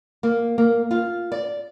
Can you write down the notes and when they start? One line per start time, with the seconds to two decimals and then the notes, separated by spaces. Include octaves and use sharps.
0.23 A#3
0.58 A#3
0.91 F4
1.32 D5